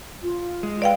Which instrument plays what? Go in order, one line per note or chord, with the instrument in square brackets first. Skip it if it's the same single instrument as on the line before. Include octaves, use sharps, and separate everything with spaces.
[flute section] F4
[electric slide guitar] G#3
[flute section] B4 [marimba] D5 F5 G5